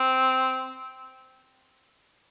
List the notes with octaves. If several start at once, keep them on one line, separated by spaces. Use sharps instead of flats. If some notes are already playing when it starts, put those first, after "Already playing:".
Already playing: C4